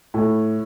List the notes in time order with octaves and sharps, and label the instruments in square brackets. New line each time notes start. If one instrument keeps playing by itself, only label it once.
[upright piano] A2